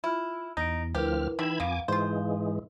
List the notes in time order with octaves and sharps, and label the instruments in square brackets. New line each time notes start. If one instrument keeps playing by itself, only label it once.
[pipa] E4 [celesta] F4 F6
[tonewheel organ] E2 [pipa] D#4 [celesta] A#6 D7
[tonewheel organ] D2 F3 F6 [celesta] E4 A#4 B4 [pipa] G4
[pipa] D3 G3 [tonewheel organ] E3 B5 G#6 [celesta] D#4 E6 E7
[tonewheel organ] F2 G#5 D6 [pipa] A#3 B3 [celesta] F5
[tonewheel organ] G#2 E3 G#3 [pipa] F4 C5